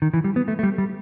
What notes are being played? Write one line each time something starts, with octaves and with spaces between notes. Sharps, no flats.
D#3
E3
G3
B3
A3
A3
G3
G3